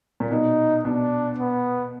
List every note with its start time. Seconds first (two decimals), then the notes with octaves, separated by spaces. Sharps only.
0.20 A#2
0.31 B2 D#4
0.85 B2 D4
1.38 B3